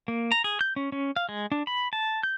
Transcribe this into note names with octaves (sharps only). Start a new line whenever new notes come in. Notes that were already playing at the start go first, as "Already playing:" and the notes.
A#3
A#5
G#4
G6
C#4
C#4
F5
G#3
D4
B5
A5
G6